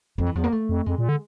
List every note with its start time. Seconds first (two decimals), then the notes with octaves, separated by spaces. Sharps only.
0.18 F2 F3
0.27 E3
0.36 E2 F3
0.44 A#3
0.52 A3
0.69 F2
0.86 F2 G#3
0.98 A#2
1.09 D3